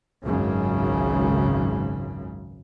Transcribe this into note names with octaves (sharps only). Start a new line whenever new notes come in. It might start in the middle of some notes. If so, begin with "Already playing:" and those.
G#1 C#2 F#2 C#3